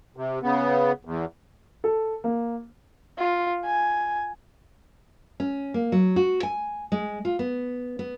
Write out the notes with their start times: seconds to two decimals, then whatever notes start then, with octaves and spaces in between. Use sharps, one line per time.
0.17 C3
0.42 C#3 B3
1.05 E2
1.84 A4
2.24 A#3
3.18 F4
3.65 G#5
5.40 C#4
5.74 A#3
5.92 F#3
6.16 F#4
6.43 G#5
6.92 G#3
7.25 F4
7.39 B3
7.99 B3